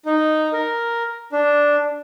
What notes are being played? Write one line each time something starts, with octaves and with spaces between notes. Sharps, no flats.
D#4
A#4
D4